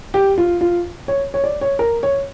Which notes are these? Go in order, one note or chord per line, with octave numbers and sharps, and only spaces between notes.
G4
F4
F4
C#5
C#5
D5
C#5
A#4
C#5